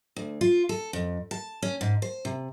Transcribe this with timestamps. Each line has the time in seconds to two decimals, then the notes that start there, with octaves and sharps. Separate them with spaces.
0.16 D2
0.41 F4
0.69 A4
0.93 F2
1.31 A5
1.62 C#4
1.81 G#2
2.02 C5
2.25 C3